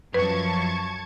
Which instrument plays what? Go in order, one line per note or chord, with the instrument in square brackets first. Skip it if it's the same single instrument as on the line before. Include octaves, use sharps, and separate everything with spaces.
[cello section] F#2 F3 [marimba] B4 [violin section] A5 C#6 G#6